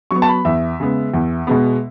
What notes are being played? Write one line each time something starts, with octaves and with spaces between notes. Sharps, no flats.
F#3 B3 C#6
A5
B5
E2 E5
C#3 G#3 B3
E2
B2 G#3 B3